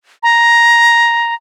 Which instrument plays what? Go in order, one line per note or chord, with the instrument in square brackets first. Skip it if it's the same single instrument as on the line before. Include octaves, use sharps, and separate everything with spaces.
[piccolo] A#5